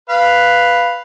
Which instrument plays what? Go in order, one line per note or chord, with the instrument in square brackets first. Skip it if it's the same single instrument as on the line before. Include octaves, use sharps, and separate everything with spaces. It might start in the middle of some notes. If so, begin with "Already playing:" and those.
[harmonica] B4 F5